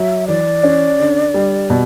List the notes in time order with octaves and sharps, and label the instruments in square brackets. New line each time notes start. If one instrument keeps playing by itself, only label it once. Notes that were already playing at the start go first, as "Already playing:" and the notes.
Already playing: [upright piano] F#3 [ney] E5
[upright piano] E3 [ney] D5
[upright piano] C#4
D3
G3
B2